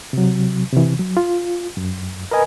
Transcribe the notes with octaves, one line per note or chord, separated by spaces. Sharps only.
C3 F#3
C3 E3
F#3
F4
F#2
A#4 B4 D#5 G#5